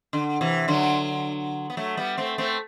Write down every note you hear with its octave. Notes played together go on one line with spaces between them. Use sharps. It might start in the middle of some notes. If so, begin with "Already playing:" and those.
D3
C3 E3
D3 F#3
B3
F#3 A3
G3 B3
A3 C4
A3 C4